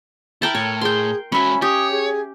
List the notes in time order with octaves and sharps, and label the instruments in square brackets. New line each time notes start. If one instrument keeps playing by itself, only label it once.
[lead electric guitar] E4 [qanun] A#4 G5 A5
[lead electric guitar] A2 [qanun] C#5
[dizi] G#4 [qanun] G5 C6
[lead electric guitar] G#3 F#4 [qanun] C#4 E5 [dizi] B5
[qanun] G4 [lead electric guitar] C#5 [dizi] D#6
[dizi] G#4